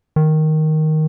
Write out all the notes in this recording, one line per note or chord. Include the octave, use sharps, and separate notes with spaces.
D#3